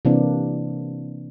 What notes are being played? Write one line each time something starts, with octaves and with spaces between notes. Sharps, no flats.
C3 E3 A#3 C4 D4